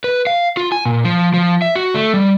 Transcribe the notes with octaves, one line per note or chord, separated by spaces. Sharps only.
B4
F5
F4
G#5
A#2
F3
F3
E5
F#4
A3
G3